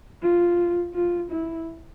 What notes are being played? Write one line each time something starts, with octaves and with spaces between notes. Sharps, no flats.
F4
F4
E4